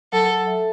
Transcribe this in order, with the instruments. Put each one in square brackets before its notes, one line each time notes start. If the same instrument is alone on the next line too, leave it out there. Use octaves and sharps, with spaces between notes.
[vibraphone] F#3 [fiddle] A4
[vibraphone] A4
E5